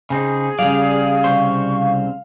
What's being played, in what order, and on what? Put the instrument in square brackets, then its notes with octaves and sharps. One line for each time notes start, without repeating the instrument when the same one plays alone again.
[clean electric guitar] C#3 C4 D#4 [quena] G#4
[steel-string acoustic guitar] C#3 G3 [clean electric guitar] D5 [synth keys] F5
[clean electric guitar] C2 C4 C5 [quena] C#6